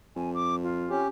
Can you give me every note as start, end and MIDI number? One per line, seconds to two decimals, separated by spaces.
0.16 1.04 41
0.16 0.33 80
0.34 0.56 86
0.63 1.02 65
0.90 1.08 61
0.90 1.08 67